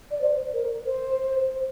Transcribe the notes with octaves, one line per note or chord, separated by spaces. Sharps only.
D5
C5
A#4
C5